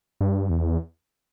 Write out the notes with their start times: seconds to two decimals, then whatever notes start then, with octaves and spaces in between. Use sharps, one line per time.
0.21 G2
0.50 E2